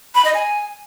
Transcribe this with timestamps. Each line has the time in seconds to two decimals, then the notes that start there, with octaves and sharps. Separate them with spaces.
0.15 B5
0.25 D#5
0.34 G#5